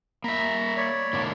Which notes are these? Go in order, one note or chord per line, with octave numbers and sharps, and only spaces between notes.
A#3 E5 A#5 B5
C#5 D5 B5
G#2 D3 A#3